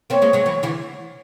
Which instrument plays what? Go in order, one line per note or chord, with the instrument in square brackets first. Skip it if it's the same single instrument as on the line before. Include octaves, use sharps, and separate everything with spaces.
[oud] A#3 C4 [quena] C#5
[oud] G#3 A#3
F#3 G#3
E3 F#3
D3 E3